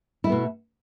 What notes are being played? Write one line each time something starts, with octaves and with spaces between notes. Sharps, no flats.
B2 A3 B3 E4